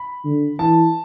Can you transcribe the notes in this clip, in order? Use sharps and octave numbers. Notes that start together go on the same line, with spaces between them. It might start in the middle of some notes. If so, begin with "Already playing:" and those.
Already playing: B5
D3
E3 A5